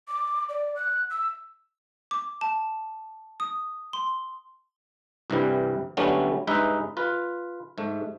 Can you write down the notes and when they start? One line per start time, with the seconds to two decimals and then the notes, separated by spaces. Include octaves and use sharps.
0.08 D6
0.49 D5
0.76 F#6
1.11 E6
2.11 D6
2.41 A5
3.40 D#6
3.93 C6
5.30 C2 G2 C3 E3 G3
5.97 D3 F#3 G3 A3 B3 C#4
6.47 G2 G#3 D#4 B4 E5
6.97 F4 B4
7.78 G#2 A3